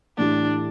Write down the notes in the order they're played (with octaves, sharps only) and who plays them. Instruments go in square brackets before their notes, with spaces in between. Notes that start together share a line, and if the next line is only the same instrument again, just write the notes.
[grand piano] A2 E3 A3 E4 G4 [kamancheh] D4